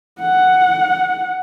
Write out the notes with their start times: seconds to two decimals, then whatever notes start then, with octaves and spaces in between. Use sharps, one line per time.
0.21 F#5